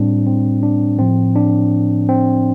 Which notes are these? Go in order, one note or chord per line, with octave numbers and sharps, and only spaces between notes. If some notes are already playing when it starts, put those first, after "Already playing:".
Already playing: A2 G3 C4 D4
C4
D4
A2 F3 C4
D4
C4